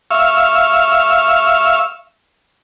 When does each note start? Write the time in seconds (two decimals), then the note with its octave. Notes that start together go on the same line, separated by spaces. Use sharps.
0.11 E5 F5 C#6